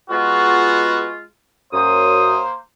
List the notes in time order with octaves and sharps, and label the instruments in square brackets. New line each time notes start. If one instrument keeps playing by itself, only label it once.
[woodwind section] G#3 F4 [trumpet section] B3 F#4
[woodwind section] F#2 D#6 [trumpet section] A#3 C5